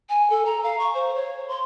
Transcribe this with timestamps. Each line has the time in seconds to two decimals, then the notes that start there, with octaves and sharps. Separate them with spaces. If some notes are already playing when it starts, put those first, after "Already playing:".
0.09 G#5
0.30 A4
0.46 A#5
0.63 F5
0.79 C#6
0.94 C5
1.15 C#5
1.48 C6